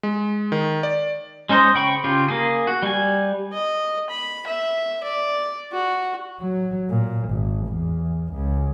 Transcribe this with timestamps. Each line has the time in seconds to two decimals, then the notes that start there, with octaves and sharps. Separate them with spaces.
0.03 G#3
0.52 D#3
0.83 D5
1.49 G#3 C#4 D#4 C5 D#5
1.75 C#3 G5 B5 C#6
2.04 C#3 F4 G4
2.28 A#3 G#4
2.67 F#4
2.83 G3 G#5
3.53 D#5
4.10 B5
4.47 E5
5.03 D5
5.72 F#4
6.41 F#3
6.90 A#2
7.29 G#1
7.67 E2
8.33 C#2